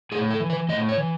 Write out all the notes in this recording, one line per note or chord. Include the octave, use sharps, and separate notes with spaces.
A2 G#4
A4
E3
B4
A2 D#5
C#5
E3